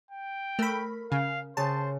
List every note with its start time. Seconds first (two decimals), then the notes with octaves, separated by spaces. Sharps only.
0.11 G5
0.59 A3 A#4 B5
1.12 C#3 F5
1.57 C#3 C5 A5